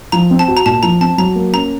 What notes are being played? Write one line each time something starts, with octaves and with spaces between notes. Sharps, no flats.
F3 A#5
C4
A5
F#4
A#5
A#2 A5
F3 A#5
C4 A5
F#3 A#5
A#3
C#4 A#5